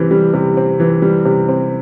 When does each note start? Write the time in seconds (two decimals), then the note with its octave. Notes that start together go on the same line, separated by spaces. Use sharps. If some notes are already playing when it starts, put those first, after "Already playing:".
Already playing: C3 E3 G3 C4
0.11 G3
0.34 C3
0.57 C4
0.80 E3
1.02 G3
1.25 C3
1.49 C4